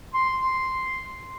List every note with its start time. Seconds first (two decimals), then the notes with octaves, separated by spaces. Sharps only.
0.14 C6